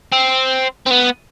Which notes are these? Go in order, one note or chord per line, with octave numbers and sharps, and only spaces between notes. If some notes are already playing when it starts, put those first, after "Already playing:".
C4
C4
B3